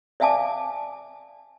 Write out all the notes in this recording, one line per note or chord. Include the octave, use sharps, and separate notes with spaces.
D5 E5 F5 G#5 A5 D6